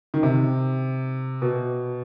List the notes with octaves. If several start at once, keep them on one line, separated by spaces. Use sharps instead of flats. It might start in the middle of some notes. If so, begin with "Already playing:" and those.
D#3
C3
B2